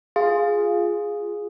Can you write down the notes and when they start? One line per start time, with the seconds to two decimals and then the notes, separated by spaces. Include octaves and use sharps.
0.16 F4 G#4